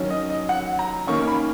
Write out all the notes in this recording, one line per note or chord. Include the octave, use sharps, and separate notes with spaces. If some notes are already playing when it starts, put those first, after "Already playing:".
Already playing: D#3 F#3 C#4
D#5
D#5
F#5
A#5
D#3 A#3 C#4 C#6
B5